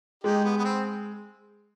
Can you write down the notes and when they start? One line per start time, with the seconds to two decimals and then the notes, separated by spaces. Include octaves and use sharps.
0.24 G#3 D#4 G4
0.44 B3
0.58 B3
0.65 C4